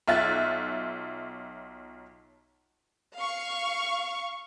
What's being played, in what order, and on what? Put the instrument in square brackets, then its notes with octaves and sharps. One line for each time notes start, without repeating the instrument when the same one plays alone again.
[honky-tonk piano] B1 F4 E5 F#6 A6
[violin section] F5 C#6